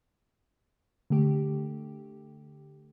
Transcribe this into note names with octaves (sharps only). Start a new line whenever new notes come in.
D3 A3 G4